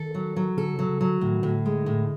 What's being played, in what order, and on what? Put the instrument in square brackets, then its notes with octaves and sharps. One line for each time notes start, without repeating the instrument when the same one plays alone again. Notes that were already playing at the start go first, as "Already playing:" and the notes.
Already playing: [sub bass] D#3 [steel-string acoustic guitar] A4
[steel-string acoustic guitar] F#3
F#3
[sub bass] D3 [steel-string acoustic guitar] A4
[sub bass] C#3
[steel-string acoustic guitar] F#3
[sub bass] C#3
[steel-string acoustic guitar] F#3
[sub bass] D3
[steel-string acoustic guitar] A2 [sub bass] D3
[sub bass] D#3
[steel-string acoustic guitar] A2 [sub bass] D3
[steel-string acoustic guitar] G#3
A2